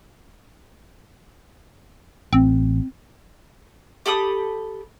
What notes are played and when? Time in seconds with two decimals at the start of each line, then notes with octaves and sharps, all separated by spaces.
2.33 A1 C4
4.06 G4 A4 B5 D#6